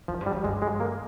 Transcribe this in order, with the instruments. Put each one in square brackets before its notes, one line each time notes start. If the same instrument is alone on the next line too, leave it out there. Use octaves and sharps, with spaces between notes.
[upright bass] F2 [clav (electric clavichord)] F3
[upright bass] G2
[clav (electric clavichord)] G3
[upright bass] F2
[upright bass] G2 [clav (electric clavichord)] G#3
[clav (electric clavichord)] G#3
A#3